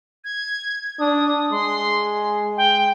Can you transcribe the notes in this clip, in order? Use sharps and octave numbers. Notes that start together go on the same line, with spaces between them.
G#6
D4 D#6
G#3 C6
G5